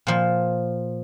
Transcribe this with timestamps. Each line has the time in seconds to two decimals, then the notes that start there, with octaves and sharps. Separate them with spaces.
0.07 A#2 F3